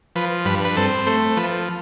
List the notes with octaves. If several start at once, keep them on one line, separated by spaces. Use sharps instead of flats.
F3 B4
G2 B4
B4
C4 A4
A3 C5
F3 B4